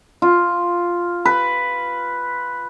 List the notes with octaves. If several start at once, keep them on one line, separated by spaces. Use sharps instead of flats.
F4
B4